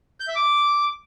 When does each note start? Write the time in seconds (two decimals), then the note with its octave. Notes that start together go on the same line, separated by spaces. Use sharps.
0.20 G6
0.28 E5
0.36 D6